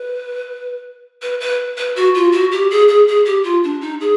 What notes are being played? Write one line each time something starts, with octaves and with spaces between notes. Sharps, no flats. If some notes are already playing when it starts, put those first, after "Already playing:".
Already playing: B4
B4
B4
B4
F#4
F4
F#4
G4
G#4
G#4
G#4
G4
F4
D4
D#4
G#4